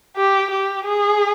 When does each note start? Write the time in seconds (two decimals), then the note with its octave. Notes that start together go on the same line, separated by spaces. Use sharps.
0.16 G4
0.51 G4
0.85 G#4